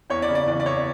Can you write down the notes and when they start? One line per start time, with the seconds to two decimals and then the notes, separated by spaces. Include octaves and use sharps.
0.10 E2 C#5
0.22 D5
0.28 C#3
0.35 D5
0.47 E3 D5
0.60 D5
0.66 E2 C#5